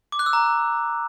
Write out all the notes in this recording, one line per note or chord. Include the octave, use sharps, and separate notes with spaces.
D6
F#6
E6
A#5